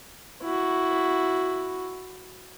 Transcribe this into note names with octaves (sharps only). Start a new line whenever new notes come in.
E4 F#4